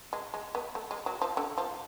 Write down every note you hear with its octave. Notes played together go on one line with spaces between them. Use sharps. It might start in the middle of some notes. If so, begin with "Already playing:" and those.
G#3
G#3
B3
A3
G#3
F#3
F3
D3
F3